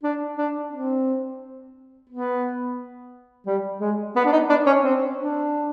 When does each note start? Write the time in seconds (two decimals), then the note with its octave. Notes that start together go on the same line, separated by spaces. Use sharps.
0.03 D4
0.38 D4
0.72 C4
2.10 B3
3.47 G3
3.81 G#3
4.16 B3
4.25 D4
4.32 D#4
4.50 D4
4.66 C#4
4.84 C4
5.19 D4